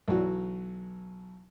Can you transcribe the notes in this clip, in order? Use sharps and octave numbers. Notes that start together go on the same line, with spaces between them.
B1 E3 F#3 F#4